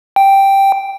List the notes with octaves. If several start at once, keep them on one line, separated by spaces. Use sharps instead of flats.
G5